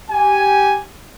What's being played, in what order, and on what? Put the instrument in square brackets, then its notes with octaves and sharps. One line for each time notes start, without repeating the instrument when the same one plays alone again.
[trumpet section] G4 G#5